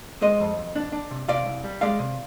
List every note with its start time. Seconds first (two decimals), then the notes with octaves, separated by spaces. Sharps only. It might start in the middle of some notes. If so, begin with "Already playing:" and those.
0.21 G#3 C5 D#5
0.40 F2
0.57 F2
0.76 D4
0.92 D4
1.11 C3
1.28 C3 D5 F5
1.46 C2
1.64 G3
1.81 G#3 D5 F5
1.99 C3